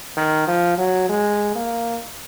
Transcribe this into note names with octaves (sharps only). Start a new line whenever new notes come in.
D#3
F3
F#3
G#3
A#3